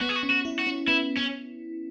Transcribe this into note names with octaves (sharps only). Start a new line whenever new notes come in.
B3 F#4
G#4
F#4
C#4
F#4
E4
F#4
C#4
B3 E4
C#4